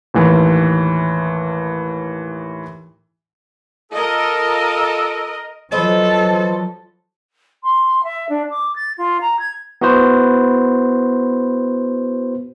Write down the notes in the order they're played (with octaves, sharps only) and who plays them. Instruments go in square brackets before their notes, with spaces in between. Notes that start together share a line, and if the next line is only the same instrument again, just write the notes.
[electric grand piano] D#2 A2 E3
[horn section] F4 A4 [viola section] A#4 D#5
[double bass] F3 F#3 [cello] A4 [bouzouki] B4 C5 D#5
[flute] C6
E5
D4
D6
A6
F4
A#5
G#6
[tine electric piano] B3 E4 F#4 B4 C5